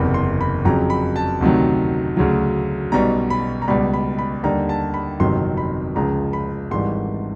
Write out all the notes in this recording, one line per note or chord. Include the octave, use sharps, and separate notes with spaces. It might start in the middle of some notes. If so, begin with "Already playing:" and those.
Already playing: F#1 E2 C3 B5
C6
B5
F2 C#3 F#3 A#5
B5
A5
D2 C3 D#3 F#3
D2 C#3 F#3
B1 B2 G3 A#5
B5
A#5
C#2 B2 G3 B5
B5
B5
D#2 D3 G3 A#5
A5
B5
G1 F2 C3 D#3 F#3 C6
B5
C#2 C#3 F3 A#5
B5
G#1 G#2 E3 G3 C6